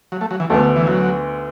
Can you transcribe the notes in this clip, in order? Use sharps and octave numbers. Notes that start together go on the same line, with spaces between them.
F#3
A3
F#3
E3
D2 D3 A3 B3
E3
F#3